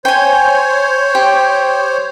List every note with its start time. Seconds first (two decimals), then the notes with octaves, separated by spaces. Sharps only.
0.05 C5 C#5 G5 G#5
1.15 G4